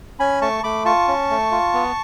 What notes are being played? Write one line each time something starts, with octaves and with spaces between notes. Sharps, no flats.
C#4 G#5 B5
A3 A5 C#6
A3 B5 D6
F4 A5 C#6
C#4
A3
F4
B3